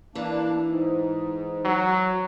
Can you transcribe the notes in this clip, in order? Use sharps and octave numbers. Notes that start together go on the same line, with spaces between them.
E3 A#3 D4
G#2
F#3